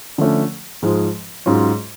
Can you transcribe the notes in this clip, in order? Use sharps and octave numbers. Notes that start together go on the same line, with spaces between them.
D3 F3 A3 C#4
G#2 F3 G#3
G#2 F#3 C#4 F4